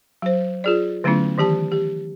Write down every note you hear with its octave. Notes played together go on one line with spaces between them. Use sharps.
F#3 C5
F4 G#4 D5
D3 F#3 A3 B3 C#4 E4
D#3 E3 G4 A5
G4